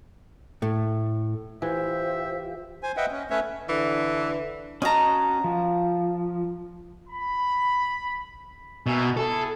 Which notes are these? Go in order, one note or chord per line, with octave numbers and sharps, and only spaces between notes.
A2 A3
E3 F4 G4 C5 E5
C5 G#5
B4 D#5 E5 F#5 G5
C#4
A3 C#4 B4 C#5 E5
D3 E3
C#4 F#4 D#5 A5 A#5
F3
B5
B2 A#4 E5 G#5
E4 G#4 A4